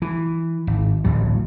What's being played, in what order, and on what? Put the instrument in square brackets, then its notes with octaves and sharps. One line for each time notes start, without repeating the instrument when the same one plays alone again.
[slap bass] E3
G#1
D1 A1 D#2 F#3